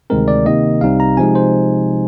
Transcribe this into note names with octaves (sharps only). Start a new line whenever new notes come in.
D2 C3 D#3 G#3 C4 A#4
D5
C3 D#3 A#3 D#5
C2 C3 G3 C4 D#4 F5
A#5
C3 F3 G#3 D#4 G#5
C5